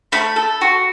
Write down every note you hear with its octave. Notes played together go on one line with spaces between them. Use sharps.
A3 B5
A4
F#4